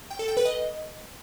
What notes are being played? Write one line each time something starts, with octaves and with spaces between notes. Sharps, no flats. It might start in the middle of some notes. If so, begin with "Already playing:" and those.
G5
A4
G5
B4
D#5